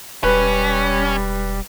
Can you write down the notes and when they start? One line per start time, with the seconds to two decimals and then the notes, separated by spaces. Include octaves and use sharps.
0.24 E1 G3 C#4 B4